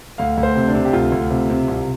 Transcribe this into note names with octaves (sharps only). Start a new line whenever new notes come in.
D2 F5
D2
C5
C3
D4
C3
G4
D2 F4
D2
C3
C3
C2